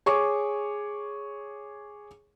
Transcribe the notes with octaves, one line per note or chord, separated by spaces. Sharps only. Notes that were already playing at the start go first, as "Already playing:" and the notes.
G#4 C#5 C#6 D6